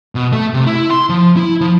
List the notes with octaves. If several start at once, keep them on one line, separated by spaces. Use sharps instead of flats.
B2
A3
C3
E4
C6
F3
E4
F3